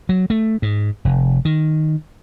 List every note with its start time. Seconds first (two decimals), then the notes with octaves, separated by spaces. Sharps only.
0.09 F#3
0.30 A3
0.62 G#2
1.05 F1
1.45 D#3